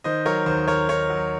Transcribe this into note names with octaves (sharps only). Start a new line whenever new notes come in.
D#3 C5 D#5
F#3 A#4 C#5
D#2 C5
D#2 A#4 C#5
D#3 A#4 C#5
F#3